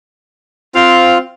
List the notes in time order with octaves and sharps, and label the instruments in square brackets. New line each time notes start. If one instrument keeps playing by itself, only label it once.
[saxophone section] C4 F5 [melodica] F4